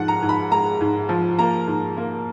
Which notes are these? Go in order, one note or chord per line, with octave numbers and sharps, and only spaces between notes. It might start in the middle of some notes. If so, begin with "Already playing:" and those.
Already playing: G#2 F3 F#5
A#5
G#2
B5
G#3 A#5
G#2
F3
A#3 A#5
G#2
A#3